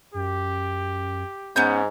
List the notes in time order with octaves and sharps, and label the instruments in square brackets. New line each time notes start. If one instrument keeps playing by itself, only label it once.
[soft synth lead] F#2 [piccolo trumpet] G4
[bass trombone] G#2 [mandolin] B3 C#4 G6